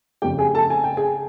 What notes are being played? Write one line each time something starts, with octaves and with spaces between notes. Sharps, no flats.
F1 F2 C#3 G4 G5
G#4 G#5
A4 A5
G#5
G5
G#4 G#5